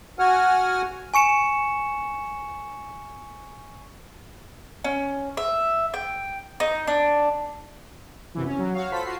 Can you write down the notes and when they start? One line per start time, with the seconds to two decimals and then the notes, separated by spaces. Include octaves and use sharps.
0.19 F#4 F#5 G#5 F6
1.14 G#5 C#6 C#7 E7
4.84 C#4
5.37 E5
5.94 G5
6.60 D#4
6.87 D4
8.35 F#2 C3 E3
8.46 C#4
8.59 F#3
8.74 F#4 C#5 F5
8.92 F4 A4 C5 B5 B6
9.04 F4 F#4 C7